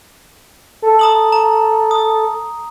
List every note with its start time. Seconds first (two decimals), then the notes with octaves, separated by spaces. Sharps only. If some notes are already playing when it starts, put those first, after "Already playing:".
0.82 A4
0.99 A#5 D#6 F#7
1.32 A#5
1.91 D#6